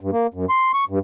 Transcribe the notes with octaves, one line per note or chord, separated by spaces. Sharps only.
G2
A#3
F#2
C6
C#6
G2